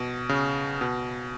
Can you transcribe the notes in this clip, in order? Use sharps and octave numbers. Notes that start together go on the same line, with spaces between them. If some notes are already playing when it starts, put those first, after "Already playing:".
Already playing: B2
C#3
B2